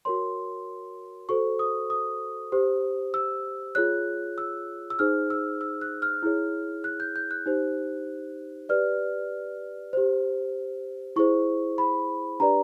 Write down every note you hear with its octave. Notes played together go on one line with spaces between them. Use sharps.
F#4 A#4 C#5 C6
F#4 A4 C5 C#6
D#6
D#6
G4 C5
E6
F4 G#4 C#5 F#6
E6
E6
D#4 G#4 C5 F6
E6
E6
F#6
F6
E4 G#4 C#5
F#6
G6
G6
F#6
D#4 G4 C5
G4 B4 D5 F6
G4 C5
E4 G#4 C5 C#6
B5
D4 G4 B4 D5 A#5